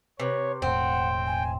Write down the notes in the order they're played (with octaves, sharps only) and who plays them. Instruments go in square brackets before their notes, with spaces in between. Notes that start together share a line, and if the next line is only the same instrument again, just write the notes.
[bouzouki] C3 [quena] B4 [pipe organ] C#5
[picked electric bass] E1 A2 [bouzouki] C4 [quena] F#5 [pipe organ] G5
[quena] G#5